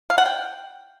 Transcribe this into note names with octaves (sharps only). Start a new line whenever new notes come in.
F5
F#5
G5